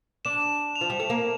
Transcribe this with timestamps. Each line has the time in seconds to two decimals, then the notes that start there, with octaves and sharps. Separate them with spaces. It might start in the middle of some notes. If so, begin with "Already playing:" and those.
0.25 D4 E7
0.76 F7
0.81 F3
0.90 G3
1.00 A3
1.10 A#3